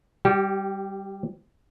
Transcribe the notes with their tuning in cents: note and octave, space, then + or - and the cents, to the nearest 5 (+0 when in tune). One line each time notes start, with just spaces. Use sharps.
G3 +0 G4 -30